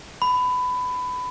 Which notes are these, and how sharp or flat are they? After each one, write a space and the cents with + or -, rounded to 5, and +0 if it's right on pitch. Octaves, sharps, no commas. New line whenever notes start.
B5 +20